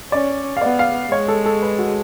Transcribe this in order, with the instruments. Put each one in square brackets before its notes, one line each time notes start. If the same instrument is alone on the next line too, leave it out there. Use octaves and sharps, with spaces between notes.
[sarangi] C#4 [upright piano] D5
[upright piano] F5
[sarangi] B3 [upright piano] D5
[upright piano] F5
[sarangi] G#3 [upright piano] C#5
[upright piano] A4
A4
B4
F#4